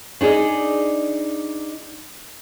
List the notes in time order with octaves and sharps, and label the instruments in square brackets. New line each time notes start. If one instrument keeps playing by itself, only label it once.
[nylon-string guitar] D4 D#4 G#4 D5 D#5